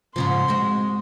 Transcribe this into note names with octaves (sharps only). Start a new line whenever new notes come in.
G#2 C#3 F3 C6
G#3 C4 F#4